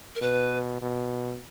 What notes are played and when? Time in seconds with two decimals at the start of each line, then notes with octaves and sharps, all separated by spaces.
0.15 A#4
0.21 B2 B4
0.82 B2